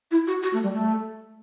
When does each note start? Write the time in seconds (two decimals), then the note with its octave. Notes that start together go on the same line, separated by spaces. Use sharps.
0.11 E4
0.27 F#4
0.43 F#4
0.53 A3
0.63 G3
0.73 A3